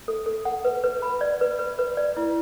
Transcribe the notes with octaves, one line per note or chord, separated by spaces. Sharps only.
A4
A4
F#5
B4
B4
B5
D5
B4
B4
B4
D5
E4